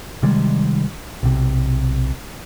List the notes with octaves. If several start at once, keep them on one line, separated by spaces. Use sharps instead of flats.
C3 D#3 G3 G#3
B1 C3